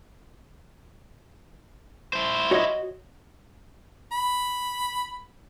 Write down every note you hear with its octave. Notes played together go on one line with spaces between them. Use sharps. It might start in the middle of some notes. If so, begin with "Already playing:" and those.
E4 C5
F#4 C#5 D#5
B5